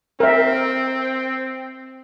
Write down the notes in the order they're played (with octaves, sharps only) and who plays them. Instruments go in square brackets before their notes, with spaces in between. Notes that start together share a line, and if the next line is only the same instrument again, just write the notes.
[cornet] C4 [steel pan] A#4 E5